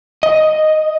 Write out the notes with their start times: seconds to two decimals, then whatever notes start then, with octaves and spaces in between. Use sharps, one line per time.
0.23 D#5